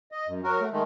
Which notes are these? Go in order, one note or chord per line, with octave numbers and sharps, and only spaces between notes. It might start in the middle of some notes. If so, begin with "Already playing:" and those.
D#5
F#2
F#3 F#4 A#4
A3
D#3 G#3 A3